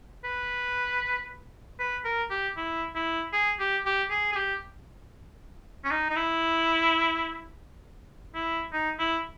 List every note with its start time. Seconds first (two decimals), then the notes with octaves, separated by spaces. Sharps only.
0.24 B4
1.79 B4
2.05 A#4
2.30 G4
2.57 E4
2.95 E4
3.33 G#4
3.59 G4
3.85 G4
4.10 G#4
4.32 G#4
4.36 G4
5.84 C#4
5.91 D#4
6.10 D#4
6.16 E4
8.35 E4
8.73 D#4
8.99 E4